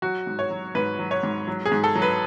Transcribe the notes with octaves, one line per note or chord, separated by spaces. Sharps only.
F#3 F#4
G#2
C#5
F#3
G#2 B4
F#3
C#5
G#2
F#3
G#4
G#2
A4
F#3
B4